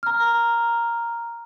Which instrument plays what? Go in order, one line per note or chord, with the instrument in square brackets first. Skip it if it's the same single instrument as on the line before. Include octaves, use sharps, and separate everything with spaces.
[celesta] A#5 F6